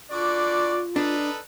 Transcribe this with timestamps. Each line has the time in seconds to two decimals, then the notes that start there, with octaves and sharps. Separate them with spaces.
0.11 D3 F4 F#4 D5 D6
0.96 D4 D#4 A4 B4